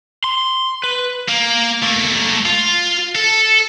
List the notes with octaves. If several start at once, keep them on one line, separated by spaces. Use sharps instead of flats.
C6
B4
A#3
A3 A#3
F4
A4